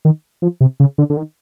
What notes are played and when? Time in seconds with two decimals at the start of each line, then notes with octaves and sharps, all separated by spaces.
0.05 D#3
0.42 F3
0.61 C3
0.80 C#3
0.98 D3
1.10 D3
1.17 D#3